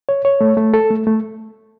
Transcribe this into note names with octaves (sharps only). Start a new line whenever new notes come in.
C#5
C#5
A3
A3
A4
A3
A3